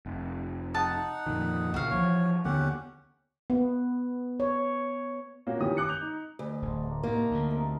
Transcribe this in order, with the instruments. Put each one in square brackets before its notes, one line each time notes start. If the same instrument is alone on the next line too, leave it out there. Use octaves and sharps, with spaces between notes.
[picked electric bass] F1
[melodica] D#4 F#5 [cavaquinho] A5 D#6
[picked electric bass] F2 A#2 D#3
[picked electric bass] C#2 A#2 [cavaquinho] F#4 F5
[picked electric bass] E3 F3 [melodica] C#5
[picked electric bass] D#2 D3 B3 [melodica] C#4 G4 F#5
[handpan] B3
C#5
[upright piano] A#2 A#3 C#4 F#4
D#3 E3 C#4 G4 D#6
D6 D#6 F#6 C#7
G6 F7
D#4
[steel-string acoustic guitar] D2 [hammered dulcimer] B4 D#5 G#5
[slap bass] D1 [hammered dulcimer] D4 C5
[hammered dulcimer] F#3 A3 A#3
[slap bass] A2 C3 [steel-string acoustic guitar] A#3 [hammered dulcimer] D#4 F#4 A4
[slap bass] D2 D3 [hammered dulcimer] F#3
[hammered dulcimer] C3 A4 A#4